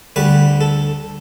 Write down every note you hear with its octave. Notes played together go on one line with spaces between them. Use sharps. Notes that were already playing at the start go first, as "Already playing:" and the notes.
D2 D3 G3 B4
A4